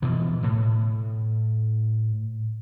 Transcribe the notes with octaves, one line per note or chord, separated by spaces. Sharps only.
B2 E3 F3
A2